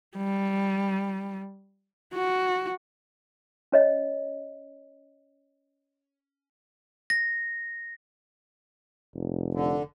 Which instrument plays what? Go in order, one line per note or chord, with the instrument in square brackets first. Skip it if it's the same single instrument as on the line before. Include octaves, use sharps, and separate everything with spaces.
[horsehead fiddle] G3
F#4
[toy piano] C#4 C#5 D#5
[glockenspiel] A#6
[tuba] F1
[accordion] D3